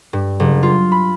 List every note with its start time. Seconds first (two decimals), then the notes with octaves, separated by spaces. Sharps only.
0.13 G2
0.40 F#1
0.63 F4
0.92 B5